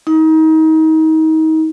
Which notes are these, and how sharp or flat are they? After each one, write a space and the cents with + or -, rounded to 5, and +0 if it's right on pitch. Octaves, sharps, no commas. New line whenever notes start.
D#4 +30